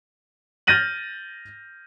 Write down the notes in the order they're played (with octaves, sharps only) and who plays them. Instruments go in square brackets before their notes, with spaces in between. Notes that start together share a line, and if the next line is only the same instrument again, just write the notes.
[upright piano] F6 G6 A6 A#6 D#7 F#7